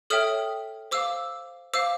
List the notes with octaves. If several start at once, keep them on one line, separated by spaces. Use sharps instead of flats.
A4 C#5 E5 G5 D#6 F6
C5 F5 D6 E6
C5 F5 D6 E6